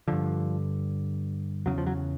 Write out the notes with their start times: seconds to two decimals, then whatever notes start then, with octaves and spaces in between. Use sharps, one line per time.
0.08 G2 D3 F3
1.66 E2 C#3 F#3
1.78 F3
1.86 F#3